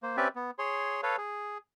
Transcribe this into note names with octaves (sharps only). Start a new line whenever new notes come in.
A#3 C5
C4 C#4 G4 B4 D5 E5
B3
G#4 C#5 C6
A4 B4 C#5 F5
G#4